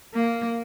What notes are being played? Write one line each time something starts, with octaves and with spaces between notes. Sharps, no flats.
A#3